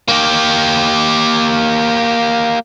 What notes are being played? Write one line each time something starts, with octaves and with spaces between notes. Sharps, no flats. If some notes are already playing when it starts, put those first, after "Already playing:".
A#3 G4